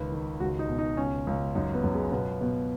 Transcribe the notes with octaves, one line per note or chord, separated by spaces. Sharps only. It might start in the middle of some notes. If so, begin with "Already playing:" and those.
Already playing: C#2 D#3 B4
D#3
C#2 F#4
D#4
B2
D#4
C#2 C#4
C#2
F#2 D#4
B3
F#2
G#3
B2 B3
B2